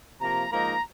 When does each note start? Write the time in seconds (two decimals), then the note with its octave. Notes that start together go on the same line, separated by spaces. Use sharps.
0.20 C3 F3 A#3 A#5
0.51 G#2 F3 A#3 D#4 A#5